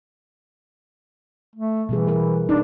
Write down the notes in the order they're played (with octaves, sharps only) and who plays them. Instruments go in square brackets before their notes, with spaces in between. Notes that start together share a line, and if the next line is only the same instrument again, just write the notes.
[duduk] A3
[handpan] B2 G3 G#4 [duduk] E3
[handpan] A#4 B4
[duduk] D4 [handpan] D#4